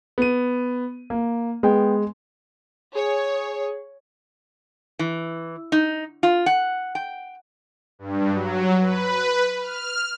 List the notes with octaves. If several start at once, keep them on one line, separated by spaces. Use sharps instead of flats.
B3 D#7
A#3
G#3 B3 G5
G#4 C#5
E3
D#4
F4
F#5
G5
G2
F#3
B4
F6